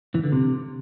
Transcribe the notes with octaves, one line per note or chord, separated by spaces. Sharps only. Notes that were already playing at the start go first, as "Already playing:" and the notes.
E3
D3
C3